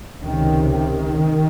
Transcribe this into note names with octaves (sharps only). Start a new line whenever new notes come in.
C#2 C3 D#3
D#3